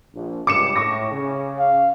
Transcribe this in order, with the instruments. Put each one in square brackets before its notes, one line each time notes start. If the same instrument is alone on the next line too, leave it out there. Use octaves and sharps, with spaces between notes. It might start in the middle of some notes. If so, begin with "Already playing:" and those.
[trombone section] A#1
[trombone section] C#2 G2 [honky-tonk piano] D6 C#7 E7
[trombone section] A2 [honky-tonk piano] C#6 D6 A#6
[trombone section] C#3
[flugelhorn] F5